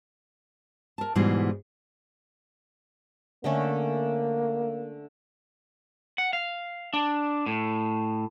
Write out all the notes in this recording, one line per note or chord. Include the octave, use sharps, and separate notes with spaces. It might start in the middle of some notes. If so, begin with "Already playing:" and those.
A#4 A5
G#2 B2 E3 G3 G#3
D3 A3 A#3 C#4
F#5
F5
D4
A2